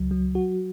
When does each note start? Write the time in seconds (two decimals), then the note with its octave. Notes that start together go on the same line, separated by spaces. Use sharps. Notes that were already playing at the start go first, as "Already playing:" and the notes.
Already playing: C#2 F#3
0.11 F#3
0.35 F#4